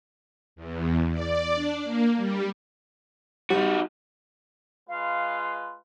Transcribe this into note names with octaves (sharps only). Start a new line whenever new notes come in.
E2
D5
D4
A#3
G3
G3 D#4 F#4
G#3 F4 B4 F5